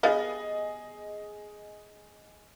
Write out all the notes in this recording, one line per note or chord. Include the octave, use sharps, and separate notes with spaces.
G3 B3 G#4 D#5 F5